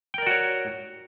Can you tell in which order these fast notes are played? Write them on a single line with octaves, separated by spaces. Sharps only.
G5 A#4 D5 F#4 C#5